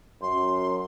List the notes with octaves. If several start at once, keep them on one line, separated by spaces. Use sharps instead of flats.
F#2 C6